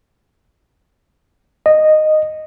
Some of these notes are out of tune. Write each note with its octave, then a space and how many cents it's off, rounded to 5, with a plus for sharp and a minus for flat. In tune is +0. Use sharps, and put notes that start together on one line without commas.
D#5 -10